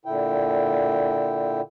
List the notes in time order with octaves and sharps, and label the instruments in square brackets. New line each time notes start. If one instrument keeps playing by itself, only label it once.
[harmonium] A#2 D3 E4 G5